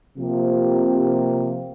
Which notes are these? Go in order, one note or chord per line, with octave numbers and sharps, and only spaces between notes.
C3 F3 A#3